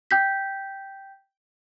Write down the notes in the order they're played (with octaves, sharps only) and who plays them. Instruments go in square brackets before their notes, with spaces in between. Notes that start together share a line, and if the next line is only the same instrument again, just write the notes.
[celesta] G5 G6 B6